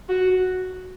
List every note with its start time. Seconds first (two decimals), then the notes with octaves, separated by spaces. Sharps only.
0.09 F#4